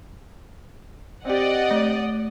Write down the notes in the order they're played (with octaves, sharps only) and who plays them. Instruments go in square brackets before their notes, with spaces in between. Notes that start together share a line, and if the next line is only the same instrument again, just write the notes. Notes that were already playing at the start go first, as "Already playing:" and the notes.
[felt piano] C4 G4 [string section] D5 D#5 F#5
[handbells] A3